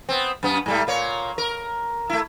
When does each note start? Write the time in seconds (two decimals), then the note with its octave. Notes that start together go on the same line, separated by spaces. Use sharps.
0.09 B3 C4
0.43 F#2 B3
0.66 G#2 G3 A3
0.87 A#2 A#3 C#5
1.38 A#4
2.10 A3 E4